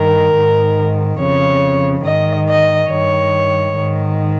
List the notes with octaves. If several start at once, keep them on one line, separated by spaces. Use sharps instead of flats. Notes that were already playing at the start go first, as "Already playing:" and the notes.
Already playing: G2 D#3 A#4
G#2 D#3
F2 C#3 C#5
G#2 D#3 D#5
D#5
G2 D#3 C#5
G#2 D#3